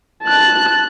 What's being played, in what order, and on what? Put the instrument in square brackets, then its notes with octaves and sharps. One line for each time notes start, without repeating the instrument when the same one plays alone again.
[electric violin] A5 F#6